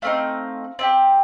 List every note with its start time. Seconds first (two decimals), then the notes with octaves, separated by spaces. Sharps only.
0.02 A3 C4 D#4 F5
0.79 C4 E4 G4